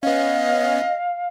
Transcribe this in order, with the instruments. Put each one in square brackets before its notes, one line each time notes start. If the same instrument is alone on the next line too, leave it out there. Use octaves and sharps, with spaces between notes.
[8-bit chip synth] B3 C#4 [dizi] D#5 [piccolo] F5